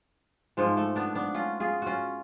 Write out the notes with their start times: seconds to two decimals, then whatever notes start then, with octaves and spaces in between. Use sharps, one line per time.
0.57 G#2 F3 G#3
0.77 A3
0.96 B3 D4
1.15 B3 D4
1.34 C#4 F4
1.60 F4 G#4
1.82 C#4 F4 F#4